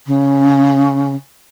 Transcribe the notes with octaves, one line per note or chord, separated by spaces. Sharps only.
C#3